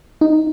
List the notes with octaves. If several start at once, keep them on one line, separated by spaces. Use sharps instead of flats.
D#4